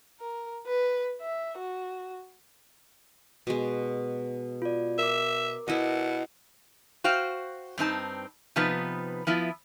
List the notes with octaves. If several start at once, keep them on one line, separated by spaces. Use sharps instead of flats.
A#4
B4
E5
F#4
B2 G#3
F4 D5
A#4 E5 D6
B2 E4 D#5
F#4 C5 F5 G5
G2 C4 D#4 A5
C3 F3 B3 D#4 B4
F3 B3 E4